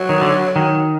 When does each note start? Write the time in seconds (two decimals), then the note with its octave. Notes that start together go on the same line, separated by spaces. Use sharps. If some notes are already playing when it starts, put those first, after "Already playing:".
Already playing: F#3
0.09 D#3
0.21 D3
0.56 D#3